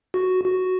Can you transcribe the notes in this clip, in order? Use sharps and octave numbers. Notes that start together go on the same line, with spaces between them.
F#4
F#4